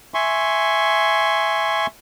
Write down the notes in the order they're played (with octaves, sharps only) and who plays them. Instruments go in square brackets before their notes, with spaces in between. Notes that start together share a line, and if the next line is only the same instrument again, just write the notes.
[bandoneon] E5 G#5 C6 C#6